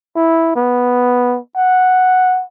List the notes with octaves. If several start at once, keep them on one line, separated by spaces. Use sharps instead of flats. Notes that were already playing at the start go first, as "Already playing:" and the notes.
E4
B3
F#5